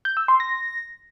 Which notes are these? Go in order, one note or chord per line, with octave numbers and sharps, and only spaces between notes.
G6
E6
C6
A#6